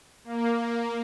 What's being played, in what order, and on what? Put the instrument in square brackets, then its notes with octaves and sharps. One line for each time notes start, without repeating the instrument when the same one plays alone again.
[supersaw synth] A#3